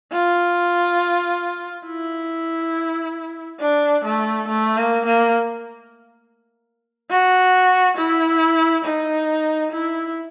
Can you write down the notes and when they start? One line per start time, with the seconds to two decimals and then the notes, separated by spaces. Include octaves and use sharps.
0.12 F4
1.87 E4
3.61 D4
4.04 A3
4.48 A3
4.77 A#3
5.06 A#3
7.10 F#4
7.97 E4
8.85 D#4
9.72 E4